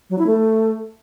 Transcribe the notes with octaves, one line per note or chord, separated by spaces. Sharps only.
F#3
E4
A3